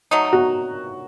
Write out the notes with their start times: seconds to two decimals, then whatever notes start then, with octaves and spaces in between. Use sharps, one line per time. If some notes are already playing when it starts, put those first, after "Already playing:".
0.11 F#3 A3 D#4
0.33 F#4